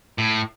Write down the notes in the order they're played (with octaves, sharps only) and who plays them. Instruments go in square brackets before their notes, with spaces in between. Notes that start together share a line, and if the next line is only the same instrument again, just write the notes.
[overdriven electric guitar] A2